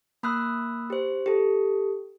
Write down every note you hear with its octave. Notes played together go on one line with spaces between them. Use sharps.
A#3 B5 D#6 E6 F#6
G4 C5
G4 A4